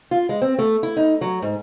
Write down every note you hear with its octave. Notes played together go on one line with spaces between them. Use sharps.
F4
G#3
C4
A3
E4
D#4
F#3
G#2